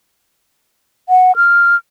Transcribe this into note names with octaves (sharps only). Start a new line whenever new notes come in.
F#5
F6